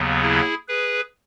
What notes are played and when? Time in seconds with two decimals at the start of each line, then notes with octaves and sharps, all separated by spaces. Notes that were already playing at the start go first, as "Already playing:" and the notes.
Already playing: D#2 C#3 F#3 B3
0.22 E4 G#4
0.68 G#4 B4